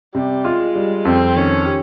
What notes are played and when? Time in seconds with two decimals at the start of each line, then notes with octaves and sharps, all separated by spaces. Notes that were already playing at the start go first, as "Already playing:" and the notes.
0.14 C3 G3
0.44 G#3 F4
0.75 G3
1.05 F2 C4
1.36 D#3 C#4
1.66 G4